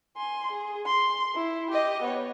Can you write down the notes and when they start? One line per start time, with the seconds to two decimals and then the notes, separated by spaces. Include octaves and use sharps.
0.17 G#5 C6
0.51 G#4
0.86 C6
1.35 E4
1.71 G4 D#5
2.02 B3 C#5